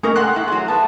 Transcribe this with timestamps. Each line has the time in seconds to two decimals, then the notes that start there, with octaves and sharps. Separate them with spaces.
0.03 A3 A#3 C#4 D#4 G#4 A#4 B4
0.16 C3 F#5 C6 F#6
0.36 E4
0.48 F#3 G#4
0.68 A3 B3 A5